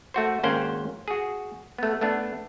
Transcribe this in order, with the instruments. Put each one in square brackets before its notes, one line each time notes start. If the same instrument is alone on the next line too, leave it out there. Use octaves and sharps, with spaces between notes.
[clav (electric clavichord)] A3 F#4 C5
G#1 A#3 C#4 C5 F#5 G5
F#4 G#4
A3 B3
A3 B3 D4